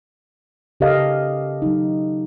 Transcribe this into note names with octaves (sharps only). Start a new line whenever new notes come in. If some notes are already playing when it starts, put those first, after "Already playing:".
C#3 G4 A4 A#4 D#5 F5
F#3 D#4